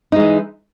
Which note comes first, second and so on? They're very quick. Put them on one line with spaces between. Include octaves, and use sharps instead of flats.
D#4 G#3 E3